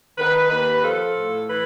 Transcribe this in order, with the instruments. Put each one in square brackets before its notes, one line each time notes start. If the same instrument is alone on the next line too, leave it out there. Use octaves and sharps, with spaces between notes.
[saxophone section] D#3 B4
D#2 B4
F3 A4
A2
E3 B4